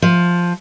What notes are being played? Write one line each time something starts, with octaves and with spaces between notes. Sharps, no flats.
F3